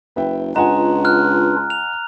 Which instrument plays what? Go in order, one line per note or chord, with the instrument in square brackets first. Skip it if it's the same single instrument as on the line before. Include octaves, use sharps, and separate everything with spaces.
[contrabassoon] F#1 [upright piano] B4 E5 G5
[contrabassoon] C#2 [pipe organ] D4 F4 B4 [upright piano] D#5 F#5 G#5 [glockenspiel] A#5
[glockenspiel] F6 F#6
F7